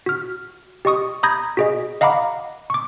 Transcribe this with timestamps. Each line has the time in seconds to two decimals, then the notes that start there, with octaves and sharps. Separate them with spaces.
0.06 F#4 F6
0.85 G4 D#5 C#6 D#6
1.23 A#5 B5 D#6 G6 G#6 A#6
1.57 F#4 G#4 D#5
2.01 D#5 F5 F#5 A#5 B5 D6
2.70 C#6 D6